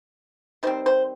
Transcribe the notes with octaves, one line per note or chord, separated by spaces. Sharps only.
D#3 G3 C4 C5
C5